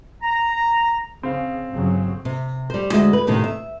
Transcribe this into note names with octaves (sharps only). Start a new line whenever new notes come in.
A#5
C#3 C4 F5
G1 C#3 F#3
C3
G3 C5
D2 G#3 F#4 E5
B4
D#2 A2 C3 D#3
E5